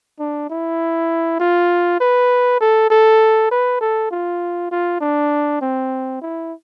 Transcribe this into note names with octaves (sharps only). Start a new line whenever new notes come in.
D4
E4
F4
B4
A4
A4
B4
A4
F4
F4
D4
C4
E4